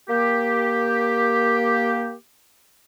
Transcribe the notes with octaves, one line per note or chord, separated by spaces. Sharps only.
A#3 G4